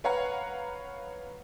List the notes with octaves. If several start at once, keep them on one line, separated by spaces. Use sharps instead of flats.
B4 C#5 F5 F#5 A#5